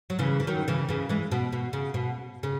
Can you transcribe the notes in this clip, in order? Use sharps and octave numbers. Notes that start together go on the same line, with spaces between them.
F#3
C#3 E3
E3
D#3 F#3
C#3 E3
C#3 E3
E3 G#3
B2
B2
C#3
B2
C#3